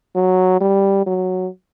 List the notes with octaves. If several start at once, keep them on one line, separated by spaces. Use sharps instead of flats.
F#3
G3
F#3